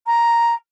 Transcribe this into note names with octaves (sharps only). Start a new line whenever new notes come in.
A#5